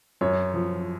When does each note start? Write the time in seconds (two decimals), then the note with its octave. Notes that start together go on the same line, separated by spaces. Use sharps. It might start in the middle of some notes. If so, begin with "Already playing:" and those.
0.21 F#2 C#5
0.54 F3